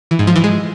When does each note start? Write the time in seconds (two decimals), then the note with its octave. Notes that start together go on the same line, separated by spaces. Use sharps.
0.11 E3
0.19 G#2
0.27 F3
0.36 E3
0.44 G#3